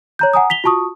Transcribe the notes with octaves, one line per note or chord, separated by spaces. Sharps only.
C#5 A#5 G6
F#5 G#5 A#5 D#6
B6 F7 G7
F4 F#4 A5 C#6 D#6